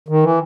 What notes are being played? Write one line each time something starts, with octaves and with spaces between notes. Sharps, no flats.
D#3
E3